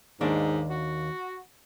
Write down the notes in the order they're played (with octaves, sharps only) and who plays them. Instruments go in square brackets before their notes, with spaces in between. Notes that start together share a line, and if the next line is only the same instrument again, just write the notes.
[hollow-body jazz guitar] D#2 A#3 D4 [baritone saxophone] G#2
[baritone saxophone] F#4